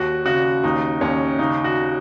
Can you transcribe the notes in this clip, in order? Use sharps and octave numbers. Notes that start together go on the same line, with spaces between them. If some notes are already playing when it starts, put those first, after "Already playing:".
Already playing: D#2 F#4
C#3 F#4
D#2 D#4
D#2 C#4
C#3 D#4
F#4